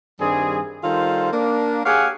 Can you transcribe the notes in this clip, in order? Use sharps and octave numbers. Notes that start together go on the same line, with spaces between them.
G2 D#3 G3 C4 G#4
D#3 G3 F4 A4 C5
A#3 D4
G4 G#4 C#5 F5 F#5 G#5